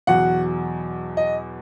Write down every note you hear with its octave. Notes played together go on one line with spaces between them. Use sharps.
E2 B2 F#3 F#5
D#5